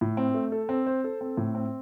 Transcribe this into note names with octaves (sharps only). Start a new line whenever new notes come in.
A2
C4
A3
A4
C4
C5
A4
C4
A2
C4